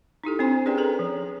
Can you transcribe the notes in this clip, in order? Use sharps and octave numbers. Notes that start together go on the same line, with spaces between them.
D#4 E4 G4 A4
C4 D4 C5 G#5 C6
C#4 G4 G#4 B4 D5 G5
G#4 A4 B4 A#5
F3